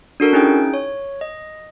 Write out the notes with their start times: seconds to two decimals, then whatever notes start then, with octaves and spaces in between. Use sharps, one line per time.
0.20 D4 F#4 A4 A#4
0.33 C#4 D#4 E4 G#4 G5
0.74 C#5
1.21 D#5